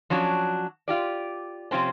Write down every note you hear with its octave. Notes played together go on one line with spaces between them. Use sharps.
F3 F#3 C#4 D4 F#4
F4 G4 D5
C3 F3 C4 C#4